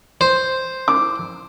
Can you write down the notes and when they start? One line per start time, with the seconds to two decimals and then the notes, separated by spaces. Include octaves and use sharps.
0.21 C5
0.88 D6